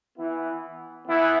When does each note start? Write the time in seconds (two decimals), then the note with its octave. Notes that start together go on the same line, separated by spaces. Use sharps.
0.17 E3 B3 E4
1.06 E3 B3 E4